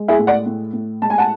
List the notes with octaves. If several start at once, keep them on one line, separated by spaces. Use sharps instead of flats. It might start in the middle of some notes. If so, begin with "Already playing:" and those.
Already playing: G#3
E4 G#4
A2
D5 F#5
A2
A2
G#3 A5
G#5
F#5 A5